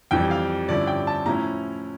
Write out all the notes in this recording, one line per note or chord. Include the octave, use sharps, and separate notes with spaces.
F2 E3 G3 G5
F5
G2 D3 F3 C#4 E4 D5
G5
A5
A2 F3 C#4 E4 A#5